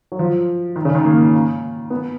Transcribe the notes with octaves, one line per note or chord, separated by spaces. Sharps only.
F#3
F3
D#3
C#3
D#3
A#3
B3